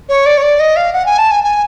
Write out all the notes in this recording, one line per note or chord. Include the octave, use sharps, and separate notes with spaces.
C#5
D5
C#5
D5
D#5
F5
F#5
G#5
A5
G#5
G#5